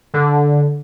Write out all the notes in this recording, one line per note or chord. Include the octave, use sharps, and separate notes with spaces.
D3